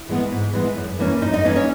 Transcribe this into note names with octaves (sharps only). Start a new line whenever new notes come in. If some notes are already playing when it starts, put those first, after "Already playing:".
Already playing: E4
E3 G#3 B3
G#2
E3 G#3 B3
F#2
E3 A#3 C#4
F#2 D#4 D#5
D#4 D#5
E3 A#3 C#4 D#4 D#5
C#4 C#5